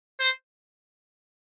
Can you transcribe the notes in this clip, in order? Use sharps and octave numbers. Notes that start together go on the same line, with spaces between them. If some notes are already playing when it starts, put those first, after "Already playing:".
C5